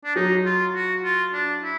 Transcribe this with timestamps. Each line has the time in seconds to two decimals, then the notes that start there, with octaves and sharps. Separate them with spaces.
0.04 D4
0.15 F#3 D#4
0.45 F4
0.75 F#4
1.03 F4
1.33 D4
1.63 E4